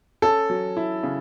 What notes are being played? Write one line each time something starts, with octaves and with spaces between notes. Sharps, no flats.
C#4 A4
F#3
E4
C#3